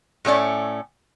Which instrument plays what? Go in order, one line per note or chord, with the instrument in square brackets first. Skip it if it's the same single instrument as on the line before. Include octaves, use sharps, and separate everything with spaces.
[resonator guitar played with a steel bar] A2 A3 C#4 D5